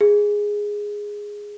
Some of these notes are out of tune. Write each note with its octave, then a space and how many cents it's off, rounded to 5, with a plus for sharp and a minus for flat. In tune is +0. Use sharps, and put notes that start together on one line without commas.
G#4 -5